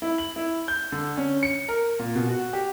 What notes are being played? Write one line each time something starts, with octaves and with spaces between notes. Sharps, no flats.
E4
F#7
E4
G6
D3
C#4
C#7
A#4
A#2
B2
F#4
G4